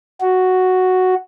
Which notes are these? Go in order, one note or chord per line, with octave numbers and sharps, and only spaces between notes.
F#4